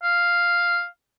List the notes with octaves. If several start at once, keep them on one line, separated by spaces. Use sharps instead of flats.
F5